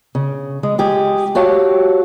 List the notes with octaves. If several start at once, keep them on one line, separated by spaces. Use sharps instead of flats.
C#3
G#3
G#3 G4 G#4
F#4 G4 C#5 F5 A5